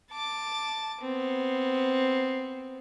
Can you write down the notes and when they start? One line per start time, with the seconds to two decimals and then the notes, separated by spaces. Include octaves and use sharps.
0.12 A5 D6
1.01 B3 C4